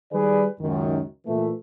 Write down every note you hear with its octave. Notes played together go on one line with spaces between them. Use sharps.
D#3 G3 G#4 B4 D5
C#2 F#2 D#3
A#2 E3 A3